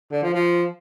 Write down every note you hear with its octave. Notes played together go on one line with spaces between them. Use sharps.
D3
F3
F3